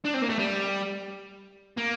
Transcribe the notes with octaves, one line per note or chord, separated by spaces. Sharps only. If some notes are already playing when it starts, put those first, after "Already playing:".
D4
C4
A#3
A3
G3
A#3